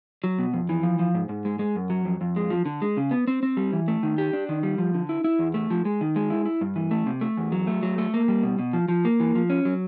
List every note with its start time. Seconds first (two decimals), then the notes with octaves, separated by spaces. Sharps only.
0.24 F#3
0.39 B2
0.53 F2
0.69 E3
0.83 F3
0.99 F3
1.15 G#2
1.29 G#2
1.45 G#3
1.59 G#3
1.76 F#2
1.90 F#3
2.05 F2
2.21 F2
2.36 G#3
2.50 F3
2.66 D3
2.82 G#3
2.97 C#3
3.11 B3
3.28 C4
3.43 C4
3.57 G3
3.73 E3
3.88 A3
4.03 D#3
4.18 G4
4.33 D4
4.49 D#3
4.63 G3
4.78 F3
4.94 D3
5.09 E4
5.24 E4
5.39 E2
5.54 A3
5.70 F3
5.85 G#3
6.01 D#3
6.16 G#3
6.30 E4
6.45 E4
6.61 G2
6.76 E3
6.91 A3
7.06 C3
7.21 A3
7.37 E2
7.52 F#3
7.67 A3
7.83 F#3
7.98 A3
8.14 A#3
8.28 G3
8.43 B2
8.59 B2
8.73 F3
8.88 F3
9.05 A#3
9.20 E3
9.35 F3
9.50 C#4
9.65 F#3